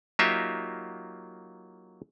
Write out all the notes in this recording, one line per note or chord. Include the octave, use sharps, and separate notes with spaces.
F#3 A#3 D#4 F4 G4 E5